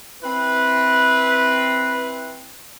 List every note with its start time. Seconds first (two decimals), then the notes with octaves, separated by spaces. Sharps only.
0.23 C4 E4 B4